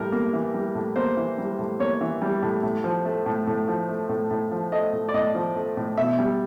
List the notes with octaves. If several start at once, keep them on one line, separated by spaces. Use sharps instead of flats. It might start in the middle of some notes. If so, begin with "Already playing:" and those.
Already playing: A2 G3 A#4
A#3
E3
G3
A2
A#3 C5
E3
G3
A2
A#3 C#5
E3
G3
A2
A2
F3
A3
A2
A2
F3
A3
A2
A2
F3
A3 D#5
A2
D5
A2 D#5
F3
A3
A2
B2 E5
G3